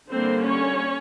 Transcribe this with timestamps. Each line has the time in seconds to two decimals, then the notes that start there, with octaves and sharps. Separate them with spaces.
0.10 D3 G3 A#3 C4 C5
0.43 C#4 C#5